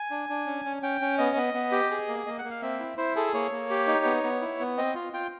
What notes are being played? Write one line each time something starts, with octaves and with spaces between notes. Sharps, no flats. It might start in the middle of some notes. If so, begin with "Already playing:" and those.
Already playing: G#5
D4
D4
C#4
C#4
C#4 G5
C#4
B3 D#5
B3
B3
G4
G#4
A#3
A#3 D#5
F#5
A#3
F5
C4 E5
E4
E4 C5
G#4 A4
A#3 C#5
A#3
G4
D#4
B3
B3
E4
B3
C4 D#5
F4
F4 G5